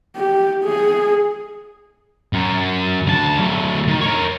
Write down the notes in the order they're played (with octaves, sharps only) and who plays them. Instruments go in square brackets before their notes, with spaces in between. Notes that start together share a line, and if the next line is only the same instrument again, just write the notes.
[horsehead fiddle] G4
G#4
[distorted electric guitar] F#2
D2 A5
F#3 A3
D#3
A#4 C#5